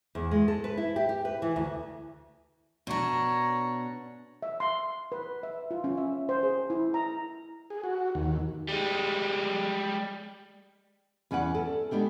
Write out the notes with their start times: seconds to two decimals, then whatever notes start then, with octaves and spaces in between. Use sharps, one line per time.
0.15 E2
0.31 G#3
0.48 A4
0.64 B4
0.77 E4
0.96 G4
1.09 G4
1.25 B4
1.42 E3
1.56 D2
2.87 B2 D4 C#5 A#5
4.43 E5
4.60 C6
5.12 B4
5.43 E5
5.71 F4
5.84 C#4
5.97 E5
6.29 C5
6.43 G#4
6.70 E4
6.94 A#5
7.70 G#4
7.84 F#4
8.15 D#2
8.69 G3 G#3
11.31 E2 C#4 B4 D5 F#5
11.55 A4
11.91 G#3 B3 D4 G4